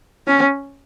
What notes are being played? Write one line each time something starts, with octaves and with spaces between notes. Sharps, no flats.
C#4